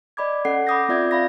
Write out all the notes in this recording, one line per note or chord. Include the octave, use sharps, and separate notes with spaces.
D5 D#5 B5 D6 G#6
C#4 A4 F#5 C7
B5 D6 D#6 G6 A#6
C4 F4 D5 E5 G6 G#6
D5 F5 B5 A#6